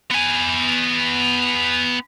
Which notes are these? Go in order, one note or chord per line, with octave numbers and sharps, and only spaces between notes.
B3 G#5